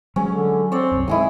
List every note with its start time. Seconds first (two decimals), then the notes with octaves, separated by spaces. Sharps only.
0.16 F#3 G#3 C#4
0.30 D3
0.72 C4 C#5 D5
0.92 C2 F#2
1.08 D#3 G#3 E4 G#5 D#6